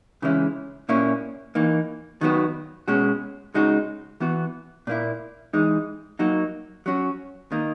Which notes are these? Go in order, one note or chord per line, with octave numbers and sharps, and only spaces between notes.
C#3 E3 G#3 C#4 E4
A#2 A#3 C#4 E4
E3 A#3 D#4
D#3 F#3 B3 F#4
B2 G#3 C#4 F#4
C#3 G#3 D#4 F#4
E3 B3 F#4
A#2 A#3 E4
E3 G#3 D#4
F#3 A#3 D#4 F#4
F#3 C#4 F#4
D#3 A#3 D#4